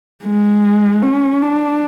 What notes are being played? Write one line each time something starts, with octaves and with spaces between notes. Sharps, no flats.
G#3
C#4
D4